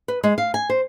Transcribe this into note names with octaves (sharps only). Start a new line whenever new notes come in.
B4
G#3
F5
G#5
C5